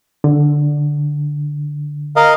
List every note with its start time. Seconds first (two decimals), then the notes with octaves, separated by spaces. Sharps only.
0.24 D3
2.16 A#4 D#5 F5